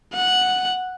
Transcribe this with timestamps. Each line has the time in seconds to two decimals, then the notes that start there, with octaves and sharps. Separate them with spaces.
0.14 F#5